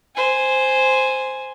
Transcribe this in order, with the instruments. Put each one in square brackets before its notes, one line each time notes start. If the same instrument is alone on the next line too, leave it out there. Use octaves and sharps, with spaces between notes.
[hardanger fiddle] C5 G#5